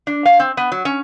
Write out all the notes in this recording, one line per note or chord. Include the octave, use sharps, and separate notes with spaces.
D4
F5
C4
B3
F#3
C#4